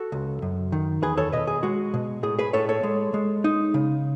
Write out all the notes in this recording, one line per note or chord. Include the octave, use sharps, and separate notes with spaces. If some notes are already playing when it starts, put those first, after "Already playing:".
Already playing: F#4 A4
C#2
F#2
D#3
E2 G#4 B4
A4 C#5
B2 B4 D#5
G#4
G#3 F#4
B2
A2 G#4
G#4 B4
A2 A4 C#5
A4 C#5
G#3
G#3
D#4
C#3